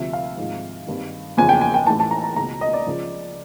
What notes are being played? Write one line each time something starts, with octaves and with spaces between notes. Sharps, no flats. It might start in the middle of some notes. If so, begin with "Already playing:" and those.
Already playing: D2 C3 F3 E5
F5
G#1 G#2 F3
G#1 G2 D#3
F#1 E2 C#3 F3 G#5
G5
G#5
G5
A1 A2 E3 A5
A5
A#5
A#5
C#2 B2 A#5
D#5
D5
C#2 C#3 F3